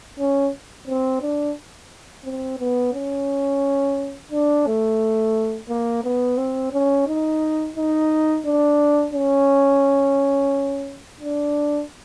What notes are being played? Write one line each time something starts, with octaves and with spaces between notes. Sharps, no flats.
C#4
C4
D4
C4
B3
C#4
D4
A3
A#3
B3
C4
C#4
D#4
D#4
D4
C#4
D4